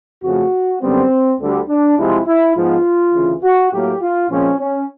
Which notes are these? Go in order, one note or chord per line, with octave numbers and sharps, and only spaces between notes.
F2 C#3 F3 A3 F#4
F#2 D3 G3 B3 C4
D2 D3 G3
D4
C2 C3 F3 G#3 C4 E4
E4
G#2 F3 G#3 B3 F4
D2 C#3 E3
F#4
A2 F#3 A#3 G4
F4
A#2 F3 G#3 C4 C#4
C#4